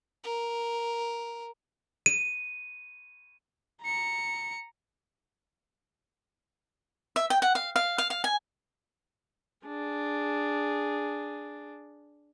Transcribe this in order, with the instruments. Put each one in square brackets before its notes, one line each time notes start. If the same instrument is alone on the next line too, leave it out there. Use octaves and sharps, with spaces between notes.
[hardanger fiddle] A#4
[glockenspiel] D#7
[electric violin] A#5 C#7
[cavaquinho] E5
G5
F#5
F5
F5
F5
F5
G#5
[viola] D4 G#4